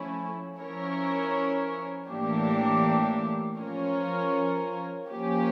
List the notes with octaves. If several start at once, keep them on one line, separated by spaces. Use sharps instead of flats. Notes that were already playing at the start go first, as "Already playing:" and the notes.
Already playing: F3 A3 C#4 E4
F3 C#4 E4 A#4 C#5
A2 E3 A#3 D4 G4
F3 C#4 F4 A#4 C#5
F3 A#3 C#4 G4